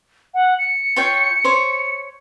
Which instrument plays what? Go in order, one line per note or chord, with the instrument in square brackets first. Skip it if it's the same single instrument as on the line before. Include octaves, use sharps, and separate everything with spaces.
[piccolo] F#5
C#7
[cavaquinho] F4 C#5 G5
C5 C#5